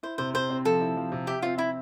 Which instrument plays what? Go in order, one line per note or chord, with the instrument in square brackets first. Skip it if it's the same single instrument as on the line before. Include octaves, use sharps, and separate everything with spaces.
[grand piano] E4 [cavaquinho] C5
[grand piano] C3 [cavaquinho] C5
[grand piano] C3 [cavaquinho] C5
[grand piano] C4
[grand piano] F3 [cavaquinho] A4
[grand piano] E4
F3
C3
[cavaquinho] G4 [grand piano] E5
[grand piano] C4 [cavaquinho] F4
[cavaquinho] E4 [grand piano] E5